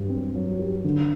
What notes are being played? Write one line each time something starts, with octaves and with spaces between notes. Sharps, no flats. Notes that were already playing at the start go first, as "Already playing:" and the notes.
Already playing: G2 F#3 G4
C4
F#3
G4
D3